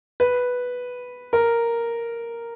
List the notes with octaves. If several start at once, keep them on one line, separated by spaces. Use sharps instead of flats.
B4
A#4